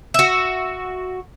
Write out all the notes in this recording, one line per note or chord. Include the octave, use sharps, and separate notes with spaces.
F#4 E5